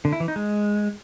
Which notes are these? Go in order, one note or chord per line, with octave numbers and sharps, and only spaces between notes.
D3
E4
E3
D#4
G#3